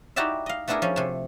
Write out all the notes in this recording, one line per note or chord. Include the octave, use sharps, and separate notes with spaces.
D#4 E4 F#4 G4 D5 E5
D#5 F5
A3 B3 D4 E4 G#4 A#4
F3 C#4
C3 A3